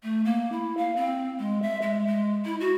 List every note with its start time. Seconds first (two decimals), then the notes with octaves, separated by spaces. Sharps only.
0.03 A3
0.25 A#3
0.52 E4
0.77 F5
0.97 C4
1.39 G#3
1.62 E5
1.82 G#3
2.07 G#3
2.45 E4
2.60 F#4